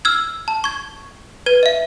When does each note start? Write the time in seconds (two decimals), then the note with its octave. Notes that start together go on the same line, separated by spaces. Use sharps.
0.05 E6 F6 G#6
0.48 A5
0.64 C#6 G#6
1.46 B4 G#6 D#7
1.63 D#5 E5